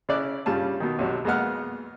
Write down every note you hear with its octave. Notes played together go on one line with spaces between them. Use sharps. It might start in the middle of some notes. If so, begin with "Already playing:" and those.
C#3 E4 D5 F#6
G2 C#3 G3 F4 A5
B2 D#3
B1 C3 F#3 F#4
F2 G#3 A#3 B3 F#5 F6